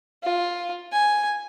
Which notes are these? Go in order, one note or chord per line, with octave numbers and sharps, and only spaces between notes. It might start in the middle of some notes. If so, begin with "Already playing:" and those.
F4
G#5